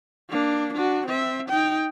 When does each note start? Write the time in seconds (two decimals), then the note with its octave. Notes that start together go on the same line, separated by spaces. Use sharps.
0.30 A#3 D4
0.73 D4 F#4
1.06 C4 E5
1.49 D#4 G5